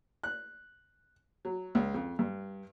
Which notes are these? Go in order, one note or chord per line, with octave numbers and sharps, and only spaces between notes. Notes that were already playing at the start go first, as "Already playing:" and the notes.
F#6
F#3
C#2
F2
G2